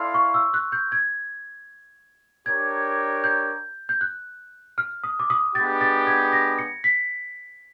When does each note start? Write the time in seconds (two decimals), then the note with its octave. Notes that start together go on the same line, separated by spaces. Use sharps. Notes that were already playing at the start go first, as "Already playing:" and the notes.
Already playing: E4 A4 D5 F5 C6
0.14 C#6
0.34 E6
0.54 F#6
0.72 G6
0.92 G#6
2.46 D4 G4 A#4 C#5 G#6
3.24 G6
3.89 G6
4.01 F#6
4.78 F6
5.04 D#6
5.20 D6
5.30 D#6
5.55 G#3 B3 D4 G4 A6
5.81 A6
6.07 G#6
6.33 A#6
6.59 C#7
6.84 B6